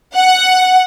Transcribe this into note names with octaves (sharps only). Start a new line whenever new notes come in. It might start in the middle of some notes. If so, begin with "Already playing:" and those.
F#5